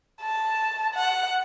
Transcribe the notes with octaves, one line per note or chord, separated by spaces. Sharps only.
A5
F#5